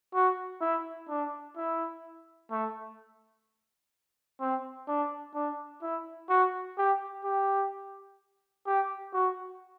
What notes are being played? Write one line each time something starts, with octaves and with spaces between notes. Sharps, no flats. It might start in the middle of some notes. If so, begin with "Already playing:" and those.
F#4
E4
D4
E4
A3
C4
D4
D4
E4
F#4
G4
G4
G4
F#4